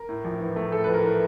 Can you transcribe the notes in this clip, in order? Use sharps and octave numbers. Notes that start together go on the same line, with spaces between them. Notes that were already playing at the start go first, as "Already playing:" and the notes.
Already playing: A#4
A2
A#1
E3
A3
A2 A4
A#1 B4
A#4
E3